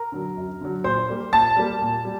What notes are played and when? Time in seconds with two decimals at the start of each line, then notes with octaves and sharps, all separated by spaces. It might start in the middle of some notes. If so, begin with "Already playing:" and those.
Already playing: A#4 A#5
0.12 D3 F#3
0.37 F#2
0.61 D3 F#3
0.84 A#2 C5 C6
1.09 G3 A#3
1.33 A#2 A5 A6
1.57 G3 A#3
1.82 A#2
2.05 G3